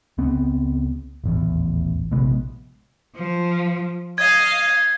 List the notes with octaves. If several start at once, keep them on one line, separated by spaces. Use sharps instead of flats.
C#2 C#3 B3 C4
D#1 A1 E2
A#1 C3 G#3 B3
F3
D#5 F5 G#6